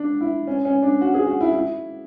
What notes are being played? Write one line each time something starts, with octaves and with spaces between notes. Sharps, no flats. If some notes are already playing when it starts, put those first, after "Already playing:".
Already playing: D4
E4
C#4
C#4
D4
F#4
G#4
F#4
E4
E4